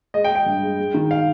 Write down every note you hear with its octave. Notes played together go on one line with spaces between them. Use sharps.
G#3 D#5
G5
G#3
G5
G2
G#3
G#3
D#3
F5